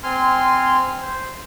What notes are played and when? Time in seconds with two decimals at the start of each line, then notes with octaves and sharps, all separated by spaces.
0.03 C4 G#5 C6 F6
1.02 C5